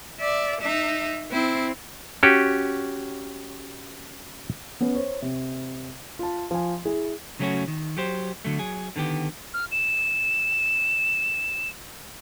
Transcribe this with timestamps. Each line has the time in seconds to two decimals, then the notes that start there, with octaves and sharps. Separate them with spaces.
0.20 D5 E5
0.62 D#4 E5
1.31 C4 E4
2.23 C#4 F#4 G4
4.80 B3 C#4 B4
4.95 C5 C#5
5.22 C3
6.19 F4 A5
6.51 F3 G#5
6.85 E4 G#4
7.39 C#3 F#3 A3 B3 C#4 F#4
7.68 D#3
7.97 F#3 G4 C5
8.45 D3 F#3 A3
8.59 F#3 G#4
8.96 D3 D#3 B3 G4
9.54 F6
9.71 E7